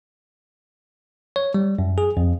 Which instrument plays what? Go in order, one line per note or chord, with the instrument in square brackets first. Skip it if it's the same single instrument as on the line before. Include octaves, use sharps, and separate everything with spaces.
[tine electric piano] C#5
G3
F#2
G#4
F2